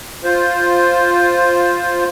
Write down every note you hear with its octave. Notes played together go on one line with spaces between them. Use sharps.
F4 C5